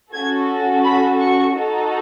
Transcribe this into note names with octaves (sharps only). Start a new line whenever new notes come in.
C#4 F#4 A4 G#6
B5
C#6
D#4 F#4 A4